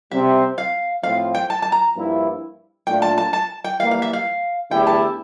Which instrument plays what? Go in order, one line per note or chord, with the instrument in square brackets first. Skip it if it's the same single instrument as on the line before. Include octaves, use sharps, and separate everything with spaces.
[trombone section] C3 G3 C4 G4 [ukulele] E5
[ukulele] F5
[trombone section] A2 F3 C4 F4 [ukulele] F5
[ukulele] G5
A5
A5
A#5
[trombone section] G2 F3 A#3 E4
[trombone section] A#2 A3 D4 F4 [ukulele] G5
[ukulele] A5
A5
A5
G5
[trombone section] E3 G3 A#3 [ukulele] F5
[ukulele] F5
E5
F5
[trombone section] E2 D3 A3 E4 G4 [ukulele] G5
[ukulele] A5